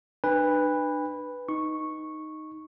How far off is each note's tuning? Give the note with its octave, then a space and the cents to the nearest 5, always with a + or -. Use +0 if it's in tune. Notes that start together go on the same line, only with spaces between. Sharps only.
D4 +40 B4 +0 G#5 -45
D#4 +0 C#6 -10